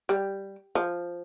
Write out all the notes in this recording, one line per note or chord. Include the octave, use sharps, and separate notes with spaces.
G3
F3